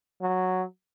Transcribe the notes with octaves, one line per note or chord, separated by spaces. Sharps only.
F#3